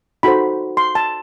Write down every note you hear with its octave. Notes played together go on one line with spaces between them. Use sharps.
D#4 F#4 A4 C5 B5
C6
A5